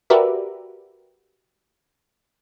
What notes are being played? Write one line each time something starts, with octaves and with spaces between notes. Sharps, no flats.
F#4 G4 A#4 B4 D5 E5